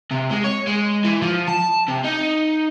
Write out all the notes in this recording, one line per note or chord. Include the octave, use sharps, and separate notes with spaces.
C3
G#3
C#5
G#3
E3
F3
A5
C3
D#4